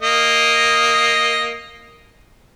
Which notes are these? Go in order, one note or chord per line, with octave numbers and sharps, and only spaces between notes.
A#3 D#5